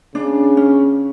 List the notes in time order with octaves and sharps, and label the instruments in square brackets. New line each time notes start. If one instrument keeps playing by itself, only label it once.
[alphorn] C#3 [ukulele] D4
[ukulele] C#4